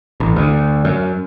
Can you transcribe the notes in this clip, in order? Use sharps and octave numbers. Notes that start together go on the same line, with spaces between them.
A1
D2
F#2